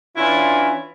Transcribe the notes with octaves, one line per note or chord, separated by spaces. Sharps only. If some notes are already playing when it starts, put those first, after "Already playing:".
E3 C#4 D4 E4 F4